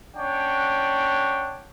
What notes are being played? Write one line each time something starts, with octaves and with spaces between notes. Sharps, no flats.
C#4 D4 C#5 F#5 G5